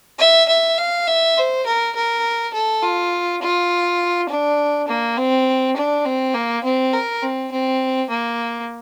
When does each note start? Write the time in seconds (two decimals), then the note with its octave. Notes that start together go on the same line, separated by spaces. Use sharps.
0.19 E5
0.49 E5
0.78 F5
1.07 E5
1.37 C5
1.66 A#4
1.96 A#4
2.53 A4
2.83 F4
3.42 F4
4.29 D4
4.88 A#3
5.17 C4
5.76 D4
6.05 C4
6.34 A#3
6.64 C4
6.93 A#4
7.22 C4
7.51 C4
8.09 A#3